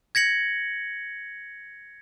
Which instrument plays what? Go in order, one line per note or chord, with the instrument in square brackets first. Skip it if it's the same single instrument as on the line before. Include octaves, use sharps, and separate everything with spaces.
[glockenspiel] G#6 A#6 C#7 F#7